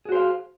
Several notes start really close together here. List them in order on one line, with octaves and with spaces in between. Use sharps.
G#4 F#4 C5 F5